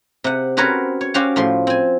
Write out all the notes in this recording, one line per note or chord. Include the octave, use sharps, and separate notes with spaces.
C3 F#5
C4 C#4 F#4 A#4 B4 C#5
C#5
C#4 F#4 G4 C5 F5
A2 F3 C6
C4 G#5